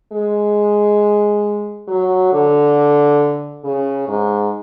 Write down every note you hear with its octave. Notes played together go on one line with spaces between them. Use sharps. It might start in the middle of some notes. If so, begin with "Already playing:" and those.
G#3
F#3
D3
C#3
G#2